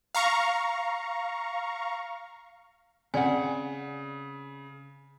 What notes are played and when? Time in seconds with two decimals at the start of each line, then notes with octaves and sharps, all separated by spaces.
0.15 F5 A#5 C#6
3.14 C#3 C4 D5 F#5 G#5